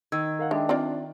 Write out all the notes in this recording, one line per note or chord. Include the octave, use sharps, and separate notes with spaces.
D#3 E6 G#6
A#4 F5 F#5
G#3 D4 D#5 E5 G5
C4 F4 D5